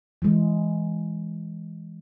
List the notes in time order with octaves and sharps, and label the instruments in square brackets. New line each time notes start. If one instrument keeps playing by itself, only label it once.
[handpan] E3 G#3